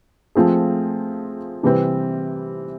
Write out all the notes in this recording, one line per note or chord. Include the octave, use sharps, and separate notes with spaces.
F3 A3 C4 F4 G#4
C3 E3 G3 C4